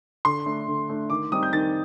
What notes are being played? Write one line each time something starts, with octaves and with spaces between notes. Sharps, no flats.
D3 C6
A3 D4
D3
A3 D4
D#3 D6
G3 C4 D#4 D#6
G6
D#3 A6